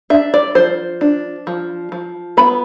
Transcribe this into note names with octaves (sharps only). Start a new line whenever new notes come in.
D4 E5
D5
F3 C5
D4
F3
F3
B3 B5